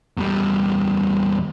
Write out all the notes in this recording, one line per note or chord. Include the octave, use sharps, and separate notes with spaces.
E2 G3